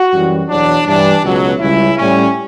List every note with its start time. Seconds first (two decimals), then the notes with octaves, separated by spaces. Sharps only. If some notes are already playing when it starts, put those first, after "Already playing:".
Already playing: F#4
0.12 F#2 E3 G3
0.48 E2 B2 F#3 D4
0.86 G2 E3 G3 D4
1.23 C#2 B2 F#3
1.59 C#2 C#3 G3 E4
1.97 A2 G3 C#4